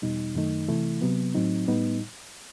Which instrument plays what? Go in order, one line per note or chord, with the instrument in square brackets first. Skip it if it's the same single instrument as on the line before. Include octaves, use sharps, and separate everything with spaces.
[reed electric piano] E2 B2 G3 D#4
F#2 D#3 A3 D#4
C3 E3 A3 E4
C3 F#3 B3
A2 F#3 C4 D#4
A2 G3 B3 D#4